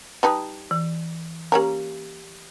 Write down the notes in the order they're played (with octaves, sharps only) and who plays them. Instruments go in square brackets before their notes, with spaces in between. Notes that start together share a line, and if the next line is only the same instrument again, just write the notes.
[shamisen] G3 D#4 B4 [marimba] A5 D#6
[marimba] E3
[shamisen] A#3 C#4 A#4 [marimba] G4 G#5